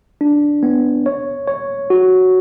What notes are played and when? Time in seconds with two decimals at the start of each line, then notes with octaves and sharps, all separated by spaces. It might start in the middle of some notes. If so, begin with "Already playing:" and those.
0.21 D4
0.63 B3
1.06 C#5
1.47 C#5
1.90 F#4